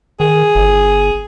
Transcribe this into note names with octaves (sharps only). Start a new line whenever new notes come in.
D#3 G#4
G1